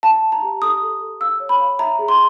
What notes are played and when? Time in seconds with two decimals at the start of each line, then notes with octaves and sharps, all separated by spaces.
0.03 F5 A5
0.23 F5
0.32 A#5
0.42 G4
0.61 A4 D#6
0.82 A4
1.01 A4
1.21 F5 E6
1.40 C#5
1.49 B5
1.60 F5
1.79 E5 A#5
1.99 G#4
2.09 C6